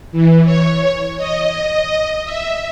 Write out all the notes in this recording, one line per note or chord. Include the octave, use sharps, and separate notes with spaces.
E3
C#5
D#5
E5